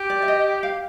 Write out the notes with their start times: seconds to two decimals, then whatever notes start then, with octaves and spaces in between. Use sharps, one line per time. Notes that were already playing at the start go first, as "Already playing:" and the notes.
Already playing: G4
0.10 D5
0.22 E5
0.28 D#5
0.63 F5